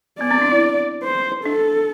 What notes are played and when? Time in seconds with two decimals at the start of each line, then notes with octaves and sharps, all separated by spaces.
0.21 B3 D5
0.31 C4
0.41 D4
0.52 E4
1.04 C5
1.44 D4 A4